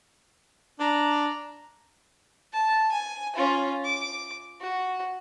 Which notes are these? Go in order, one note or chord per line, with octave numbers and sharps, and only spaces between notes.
D4 A#5
A5
G#5
C#4 F4
D6
F#4